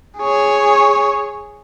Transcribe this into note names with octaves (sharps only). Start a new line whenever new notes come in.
G#4 C#5